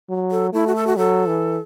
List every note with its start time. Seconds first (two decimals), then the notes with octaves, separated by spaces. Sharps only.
0.10 F#3
0.31 A4
0.53 A3 E4
0.67 F#4
0.76 A4
0.87 F#4
0.97 F#3 A4
1.27 E3